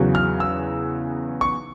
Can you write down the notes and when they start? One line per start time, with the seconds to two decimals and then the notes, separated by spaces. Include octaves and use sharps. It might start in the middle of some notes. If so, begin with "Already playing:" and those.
Already playing: E2 C#3 F#3
0.15 F6
0.40 E6
1.41 C#6